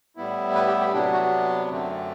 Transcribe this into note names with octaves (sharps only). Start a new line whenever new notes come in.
A2 G3 B3 E4
B4
G4
G4
C3 F#3 B3 D4 G4
F#4
F#2 D3 A3 C4